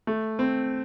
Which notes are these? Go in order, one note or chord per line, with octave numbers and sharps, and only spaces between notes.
A3
C4